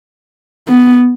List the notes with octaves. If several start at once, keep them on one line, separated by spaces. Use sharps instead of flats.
B3